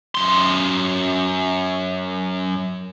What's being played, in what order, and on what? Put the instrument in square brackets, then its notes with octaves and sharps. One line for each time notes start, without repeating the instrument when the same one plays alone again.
[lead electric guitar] F#2 C6